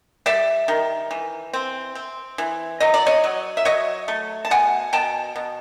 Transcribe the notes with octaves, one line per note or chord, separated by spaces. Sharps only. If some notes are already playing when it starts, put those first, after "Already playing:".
G3 D5 E5
D#3
E3
C4
C4
E3
F#3 D#5
D5
C#5 D#5
F#3
E5
F#3 C#5 D#5
A3
A5
B2 F#5 G#5
B2 G5 A5
B2